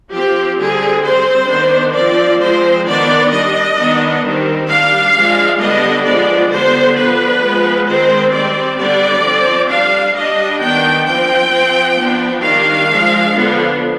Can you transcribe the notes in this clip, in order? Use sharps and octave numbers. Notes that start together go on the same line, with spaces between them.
F3 C4 G4
D3 G3 C4 G#4
G3 C4 C5
D#3 B3 D4
F3 C4 D5
F3 G#3 C4 C5
D#3 B3 D4 D5
G3 D4 D#5
D#3 B3 D4
D#3 G3 C4
G3 D4 F5
F3 G#3 D4
D3 G3 B3 D4 D#5
F3 G#3 B3 D4 D5
D3 G3 B3 C5
F3 B3 D4 B4
F3 G#3 B3
D#3 G#3 C4 C5
G3 C4 D5
D3 G3 B3 D4 D5
F3 C4
G3 D4 F5
G3 D4 D#5
D#3 B3 D4 G5
F3 C4 G5
F3 C4
F3 B3 D4
D#3 G3 D4 F5
F3 G#3 D4
D3 F3 B3 D4